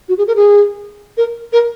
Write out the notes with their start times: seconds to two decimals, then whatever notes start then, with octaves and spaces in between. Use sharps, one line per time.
0.09 F#4
0.18 G#4
0.27 A#4
0.36 G#4
1.17 A#4
1.53 A#4